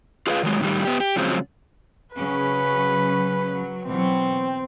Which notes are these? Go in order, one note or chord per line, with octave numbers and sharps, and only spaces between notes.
F4 G#4 B4 D5 F5
D#3 F#3 G#3
A2 D3 D#3 G3
B3 G4
G4
C#3 F3 F#3 G#3 C4
C#3 F#3 C#4 B4
F#3
B2 E3 F#3 C4